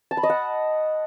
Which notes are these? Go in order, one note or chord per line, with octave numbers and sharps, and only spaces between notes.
A5
B5
D#5
F#5